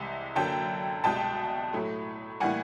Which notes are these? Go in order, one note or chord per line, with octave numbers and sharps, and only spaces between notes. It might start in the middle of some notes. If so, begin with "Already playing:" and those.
Already playing: C2 C3 E3 G#3
F#2 D3 F#3 A#3 G5 A5
C2 B2 G#3 G5 A5
A2 F#3 A3
A2 E3 G3 A#3 F#5 G#5